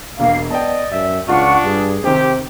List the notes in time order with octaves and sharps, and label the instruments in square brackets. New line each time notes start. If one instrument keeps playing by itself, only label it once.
[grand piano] E1 D4 [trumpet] A#3 [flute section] F5
[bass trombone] B3 [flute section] D5 [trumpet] D#5 [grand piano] G5 A5
[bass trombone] F#2 [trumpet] E5
[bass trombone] C#2 [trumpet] D4 [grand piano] F4 [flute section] F#5 C#6
[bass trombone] G2 [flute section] G#4
[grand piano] C3 D#3 [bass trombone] C4 [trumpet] G4